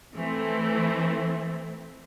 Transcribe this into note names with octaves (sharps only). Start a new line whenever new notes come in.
E3 A3 C4